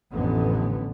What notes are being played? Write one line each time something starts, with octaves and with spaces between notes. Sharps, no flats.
A1 F2 D3 B3